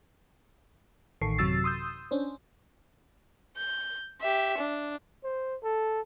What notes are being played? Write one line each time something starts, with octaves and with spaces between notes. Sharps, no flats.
A1 D#3 A4 C#6 C7
F#2 C3 F#3 E6 A6 C7
C6 D#6 E6 G6
C#4 D4 C5
G6
G4 E5
D4
C5
A4